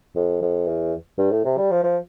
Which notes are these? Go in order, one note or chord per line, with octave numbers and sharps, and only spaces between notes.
F2
F2
E2
G2
A2
C3
G3
F3
F3